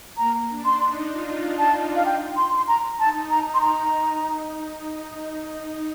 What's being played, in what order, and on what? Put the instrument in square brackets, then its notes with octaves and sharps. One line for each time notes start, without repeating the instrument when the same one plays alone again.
[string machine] A#3 [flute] A#5
[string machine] D4
[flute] C6
[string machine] D#4
F4
[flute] A5
F5
G5
C6
C6
A#5
[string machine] D#4 [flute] A5
[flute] A#5
C6
A#5